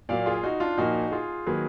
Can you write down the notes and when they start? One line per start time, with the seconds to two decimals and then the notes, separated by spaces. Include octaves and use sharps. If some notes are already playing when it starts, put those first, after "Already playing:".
0.09 A#2 F#3 A#3 D5 F5
0.26 F4 G#4
0.43 D#4 F#4
0.60 D4 F4
0.78 A#2 F3 A#3 D#4 F#4
1.12 F4 G#4
1.47 D#3 F#3 A#3 G#4 B4